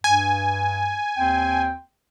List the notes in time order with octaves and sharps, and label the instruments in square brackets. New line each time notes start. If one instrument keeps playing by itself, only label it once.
[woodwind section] G2 [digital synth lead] G#5
[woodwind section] D#2 C4 G5